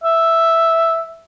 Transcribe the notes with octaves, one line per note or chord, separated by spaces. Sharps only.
E5